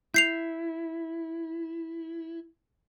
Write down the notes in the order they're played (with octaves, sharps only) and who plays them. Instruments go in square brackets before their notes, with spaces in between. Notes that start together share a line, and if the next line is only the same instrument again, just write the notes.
[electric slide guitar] E4 [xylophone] G6 C7 F7